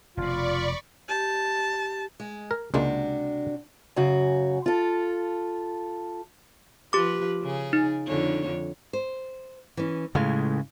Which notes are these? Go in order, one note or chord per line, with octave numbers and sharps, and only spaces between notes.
F1 B2 F4 D5 B5 C#6
G4 A5
G#3
A#4
C#2 C3 G#3 A#3 D4 F#4
F#2 C#3 F#4
F4 A4
F3 G4 B4 D6
C#3 G#4
D#4
F2 D3 C#5
C5
E3 C#4
A2 C#3 G#3 F5